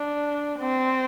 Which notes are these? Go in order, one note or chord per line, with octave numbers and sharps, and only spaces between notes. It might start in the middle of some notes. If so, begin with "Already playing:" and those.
Already playing: D4
C4